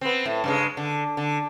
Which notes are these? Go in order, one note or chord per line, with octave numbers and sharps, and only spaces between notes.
B3 C4
A2
G2 C#3 G#3
D3
D3